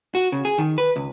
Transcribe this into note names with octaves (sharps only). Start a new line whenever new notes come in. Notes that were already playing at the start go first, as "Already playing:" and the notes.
F#4
C#3
G#4
D#3
B4
C#2